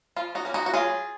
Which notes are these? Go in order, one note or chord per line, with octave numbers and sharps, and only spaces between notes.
F3 F4
D#4 F#4
A#3 C#4
D#4 F#4
F#4
F#3 F4 G#4